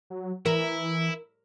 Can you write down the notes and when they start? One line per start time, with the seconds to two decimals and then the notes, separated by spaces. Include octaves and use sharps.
0.10 F#3
0.46 E3 E4 A#4